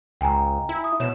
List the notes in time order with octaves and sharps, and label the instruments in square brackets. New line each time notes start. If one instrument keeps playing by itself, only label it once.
[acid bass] C#2 [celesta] G5 G#5 A#5
[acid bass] E4
[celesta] D#6
[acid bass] B2 [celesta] C#5 E7